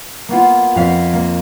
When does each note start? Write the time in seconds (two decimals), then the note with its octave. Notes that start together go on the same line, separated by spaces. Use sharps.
0.29 A#3 B3 F4
0.76 F2 F5 B6
1.13 A#3